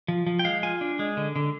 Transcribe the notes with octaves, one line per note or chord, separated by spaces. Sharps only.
F3
F3
G5
G#3 F5
F4 G#5
D4
G#3
D3
D3